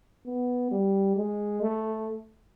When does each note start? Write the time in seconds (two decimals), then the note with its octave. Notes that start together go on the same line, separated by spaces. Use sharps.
0.27 B3
0.72 G3
1.17 G#3
1.62 A3